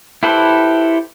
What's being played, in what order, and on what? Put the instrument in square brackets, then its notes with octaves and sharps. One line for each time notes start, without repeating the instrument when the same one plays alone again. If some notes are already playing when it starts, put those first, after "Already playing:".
[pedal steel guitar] E4 G4 A4 B4 C5